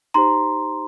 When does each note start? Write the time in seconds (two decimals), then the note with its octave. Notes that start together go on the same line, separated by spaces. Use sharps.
0.14 D#4 G4 C5 A#5 C6